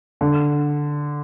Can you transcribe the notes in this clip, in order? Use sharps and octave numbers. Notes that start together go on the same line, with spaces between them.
D3